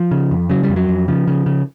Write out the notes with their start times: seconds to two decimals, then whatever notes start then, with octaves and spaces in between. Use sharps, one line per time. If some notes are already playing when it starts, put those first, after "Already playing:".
Already playing: F3
0.11 C#3
0.31 F2
0.50 C#3 F#3
0.63 G3
0.69 F2
0.76 F#3
0.89 F2
1.08 C#3 F3
1.27 C#3
1.46 C#3